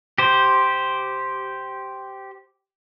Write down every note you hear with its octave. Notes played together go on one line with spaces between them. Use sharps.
G4 C5